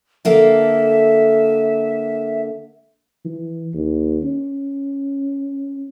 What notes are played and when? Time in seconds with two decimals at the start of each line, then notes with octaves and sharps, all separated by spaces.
0.25 D3 A#3 A4 E5
3.25 E3
3.74 D#2
4.24 C#4